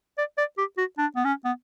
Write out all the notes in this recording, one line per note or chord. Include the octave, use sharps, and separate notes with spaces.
D5
D5
G4
F#4
D4
B3
C#4
B3